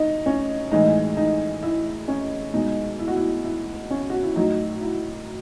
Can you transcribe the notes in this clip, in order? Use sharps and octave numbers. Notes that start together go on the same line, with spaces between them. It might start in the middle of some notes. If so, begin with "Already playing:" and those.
Already playing: D#4
C#4
A2 E3 G#3 D#4
D#4
E4
C#4
B2 G#3 D#4
E4
F#4
E4
E4
C#4
F#4
E4
A2 F#3 D#4
E4